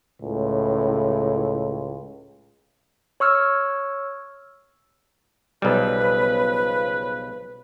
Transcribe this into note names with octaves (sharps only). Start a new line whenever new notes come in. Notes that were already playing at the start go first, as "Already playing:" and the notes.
C#2 A2
C#5 C#6 E6 F6 G#6
B1 C#3 F3 G3 B4